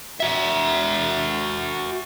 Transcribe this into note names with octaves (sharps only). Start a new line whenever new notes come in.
F#4 E5